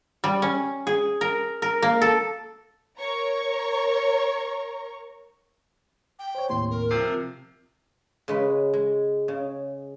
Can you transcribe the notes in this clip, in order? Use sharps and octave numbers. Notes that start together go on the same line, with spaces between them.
G3
C#4
G#4
A#4
A#4
A#3
A4
A#4 C#5 A#5 C#6
G5
C5 C#5
D#2 A2 C3 C6
A#4
C3 F3 C7
C#3 G#3 B4
G#3
C#3